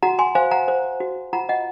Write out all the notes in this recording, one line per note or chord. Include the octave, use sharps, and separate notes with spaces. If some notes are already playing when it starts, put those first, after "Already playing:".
F#4 F#5 A#5
G#5 C6
C5 F5 G#5
F#5 A#5
C5
F#4
F4 F#5 A#5
D#5 F#5